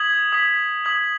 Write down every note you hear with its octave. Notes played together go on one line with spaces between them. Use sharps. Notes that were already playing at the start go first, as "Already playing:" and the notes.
Already playing: D#6 G#6 B6 F#7
D#6 G#6 B6 F#7
D#6 G#6 B6 F#7